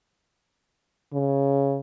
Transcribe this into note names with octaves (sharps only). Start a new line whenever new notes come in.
C#3